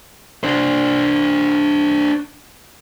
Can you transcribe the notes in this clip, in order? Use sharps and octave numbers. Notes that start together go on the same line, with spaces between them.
D4 C5